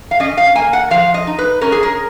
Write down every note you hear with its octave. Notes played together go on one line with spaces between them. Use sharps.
F5
C#4 D#5
F5
A#3 G#5
F#5
F3 F5
D#5
D#4
B4
C#4 A#4
G#4
A#4